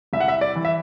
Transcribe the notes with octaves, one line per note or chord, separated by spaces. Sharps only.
C2 E5
F#5
E5
D5
E3
E5